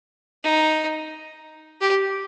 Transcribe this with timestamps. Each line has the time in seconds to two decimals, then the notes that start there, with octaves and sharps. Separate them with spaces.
0.44 D#4
1.81 G4